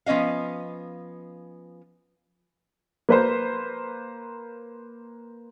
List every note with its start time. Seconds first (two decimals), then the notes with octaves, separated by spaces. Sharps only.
0.06 F3 B3 C#4 D#5 F5
3.09 A#3 B4 C5